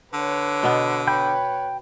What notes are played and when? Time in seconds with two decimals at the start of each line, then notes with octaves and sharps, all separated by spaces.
0.13 D3 B4 C#5
0.63 B2 B3
1.07 B4 C#5 G5 B5 G6